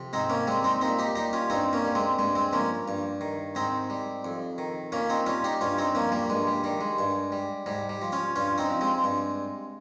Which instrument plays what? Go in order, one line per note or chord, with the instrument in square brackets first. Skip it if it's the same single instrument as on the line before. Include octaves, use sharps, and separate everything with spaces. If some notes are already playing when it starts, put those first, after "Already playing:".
Already playing: [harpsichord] F2 C3
G#2 C4 D#4
A#3 C#4
G3 G#3 C4
C4 D#4
A#2 C4 D#4
D#4 G4
G3 D#4 G4
C#4 F4
G2 C4 D#4
A#3 C#4
G3
G#3 C4
G2 G#3
G#3 C4
F3 A#3 C#4
G2
D#3
G#2 C4 D#4
G3
F2
D#3
A#2 A#3 C#4
C4 D#4
G3 C#4 F4
D#4 G4
G2 C#4 F4
C4 D#4
F3 A#3 C#4
G3 A#3
G2 G#3
G3
D#3 G3
G#3
G2
G3
G#2 G3
G3
F3
C#4 F4
G2 C#4 F4
C4 D#4
F3
G#3 C4
G2